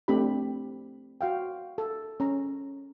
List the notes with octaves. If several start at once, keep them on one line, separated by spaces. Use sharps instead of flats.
A3 C4 D4 G4 B5
F#4 F5 G5
A4
C#4 A#5